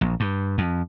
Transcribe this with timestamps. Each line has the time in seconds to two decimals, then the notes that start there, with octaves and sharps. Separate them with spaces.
0.01 A#1
0.20 G2
0.58 F2